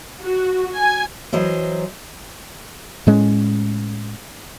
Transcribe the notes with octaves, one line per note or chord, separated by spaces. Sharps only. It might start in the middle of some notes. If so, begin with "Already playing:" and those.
F#4
G#5
E3 F#3 C5 D#5
A2 G#3 C#4